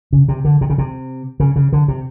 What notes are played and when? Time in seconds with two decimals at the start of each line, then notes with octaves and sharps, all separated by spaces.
0.13 C#3
0.28 C3
0.45 D3
0.61 C3
0.70 C#3
0.78 C3
1.40 C#3
1.56 C#3
1.73 D3
1.88 C3